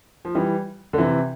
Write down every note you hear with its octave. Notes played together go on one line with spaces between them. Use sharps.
F3
E3 G3
D3
C3 E3